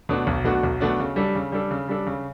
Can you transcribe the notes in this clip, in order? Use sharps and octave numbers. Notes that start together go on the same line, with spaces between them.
B2 A3 D4 F#4
B1
B2 A3 D4 F#4
B1
B2 A3 D4 F#4
C#3
G3 D4 A4
C#3
G3 D4 A4
C#3
G3 D4 A4
C#3